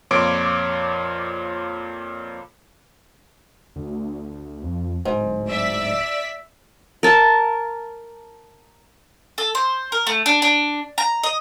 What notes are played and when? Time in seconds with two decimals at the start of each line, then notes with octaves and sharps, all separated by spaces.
0.11 F2 A#2 C#5 C6 D6 D7
3.76 D2
4.63 F2
5.05 D1 G#2
5.48 D5 E5 B6
7.03 A#4 A5
9.38 A4
9.55 C5
9.92 A#4
10.07 A3
10.26 D4
10.42 D4
10.98 A#5
11.23 D#5